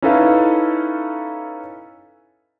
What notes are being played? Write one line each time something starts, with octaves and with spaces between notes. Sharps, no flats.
C#4 D#4 E4 A4 B4 F5